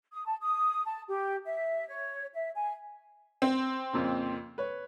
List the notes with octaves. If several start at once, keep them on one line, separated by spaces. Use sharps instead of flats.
D#6
A5
D#6
A5
G4
E5
C#5
E5
G#5
C4
F2 A#2 C#3
B4 C#5